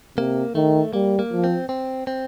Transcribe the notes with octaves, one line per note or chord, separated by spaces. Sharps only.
C3 A#3
D#3 A3
G3 A#3
A#3
F3
C4
C4
C4